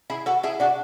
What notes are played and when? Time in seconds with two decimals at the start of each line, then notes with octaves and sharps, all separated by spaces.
0.10 E4 G#4
0.26 F#4 A4
0.43 E4 G#4
0.60 D4 F#4